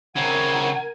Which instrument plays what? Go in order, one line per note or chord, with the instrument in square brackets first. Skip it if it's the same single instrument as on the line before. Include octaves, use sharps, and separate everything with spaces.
[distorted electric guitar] C#3 C4 [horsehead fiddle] A#4 G#5 [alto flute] F#5